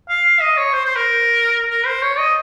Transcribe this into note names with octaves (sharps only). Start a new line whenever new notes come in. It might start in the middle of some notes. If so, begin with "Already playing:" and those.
F5
D#5
C#5
C5
C5
A#4
A#4
C5
C#5
D#5